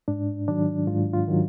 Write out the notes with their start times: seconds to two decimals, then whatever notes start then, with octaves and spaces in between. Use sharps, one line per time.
0.08 G#2 D4
0.48 D#3 F#3 D4
0.87 G#2 F4
1.13 F4
1.28 D#3 F#3